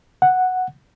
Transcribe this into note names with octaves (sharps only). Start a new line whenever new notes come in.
F#5